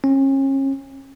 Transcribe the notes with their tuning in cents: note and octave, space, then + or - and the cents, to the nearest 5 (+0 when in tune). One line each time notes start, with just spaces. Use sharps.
C#4 -35